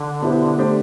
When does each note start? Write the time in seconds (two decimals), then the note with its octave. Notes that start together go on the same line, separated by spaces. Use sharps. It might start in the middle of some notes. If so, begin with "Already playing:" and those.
Already playing: D3
0.21 B2 B3 E4 G4 C5
0.57 A3 D4 G4 C5